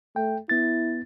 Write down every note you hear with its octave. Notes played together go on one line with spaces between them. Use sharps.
A3 G5
B3 E4 A6